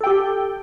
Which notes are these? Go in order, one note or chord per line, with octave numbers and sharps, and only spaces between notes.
G4 A4 G5